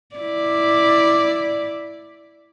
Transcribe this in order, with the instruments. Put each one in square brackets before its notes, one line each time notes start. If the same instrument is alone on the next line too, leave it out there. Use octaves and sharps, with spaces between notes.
[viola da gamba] E4 D5